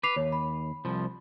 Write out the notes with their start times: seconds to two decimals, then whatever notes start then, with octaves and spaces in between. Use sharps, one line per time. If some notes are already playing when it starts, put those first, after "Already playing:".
0.03 B4 D6 C7 F7
0.16 D#2 C#5
0.32 B5
0.85 C2 F3